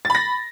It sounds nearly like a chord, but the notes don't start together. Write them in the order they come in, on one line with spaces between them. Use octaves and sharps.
A6 B5 A#6